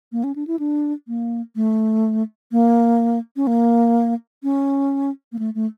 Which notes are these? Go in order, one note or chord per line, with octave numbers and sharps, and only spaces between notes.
A#3
C#4
D4
E4
D4
A#3
A3
A#3
C#4
A#3
C#4
A#3
A3
A3